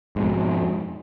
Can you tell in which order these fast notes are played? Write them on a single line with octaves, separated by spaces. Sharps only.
G#2 B2 F2